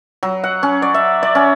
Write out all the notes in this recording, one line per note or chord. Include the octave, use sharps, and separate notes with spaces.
F#3
F#5
C#4
D5
E5
D5
C#4